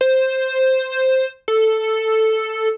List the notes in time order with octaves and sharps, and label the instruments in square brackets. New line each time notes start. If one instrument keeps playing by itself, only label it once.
[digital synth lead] C5
A4